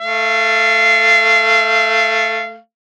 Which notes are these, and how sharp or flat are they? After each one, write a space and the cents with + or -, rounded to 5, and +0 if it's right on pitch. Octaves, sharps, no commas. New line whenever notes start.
A3 +0 F5 -25